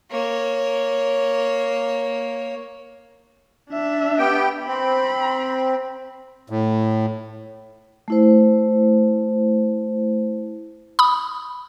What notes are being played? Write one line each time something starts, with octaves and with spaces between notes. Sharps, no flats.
A#3 C#5
D4 E5
B3 G4 G5
C4 B5
A2
A3 E4 C5
B5 D#6